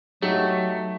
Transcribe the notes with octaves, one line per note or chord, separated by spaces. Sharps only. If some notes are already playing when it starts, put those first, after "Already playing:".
F#3 A3 D#4 F#4 G4